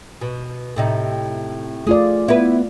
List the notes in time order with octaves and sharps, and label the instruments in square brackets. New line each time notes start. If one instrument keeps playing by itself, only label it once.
[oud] B2
A2 C3 D#4
[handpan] A3 F4 D5 [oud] G#4
[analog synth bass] B3 [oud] E4 B4